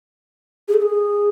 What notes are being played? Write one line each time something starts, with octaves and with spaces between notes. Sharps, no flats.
G#4
A4
G#4